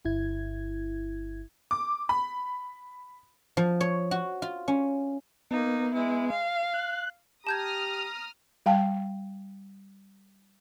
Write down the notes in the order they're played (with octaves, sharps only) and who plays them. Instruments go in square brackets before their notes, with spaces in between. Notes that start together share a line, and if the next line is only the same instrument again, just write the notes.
[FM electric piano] G1 E4 G#6
[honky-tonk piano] D6
B5
[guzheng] F3
C#5
F#4
F4
C#4
[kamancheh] A#3 D#4 [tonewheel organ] B3
[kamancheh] G#3 E4
F5
[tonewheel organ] F#6
[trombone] G4 [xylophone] A5 G6 G#6 [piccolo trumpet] A#5 [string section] D#6 F6
[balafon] G3 F5 G5 A5